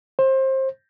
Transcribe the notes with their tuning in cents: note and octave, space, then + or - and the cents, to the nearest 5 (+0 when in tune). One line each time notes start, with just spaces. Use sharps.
C5 +25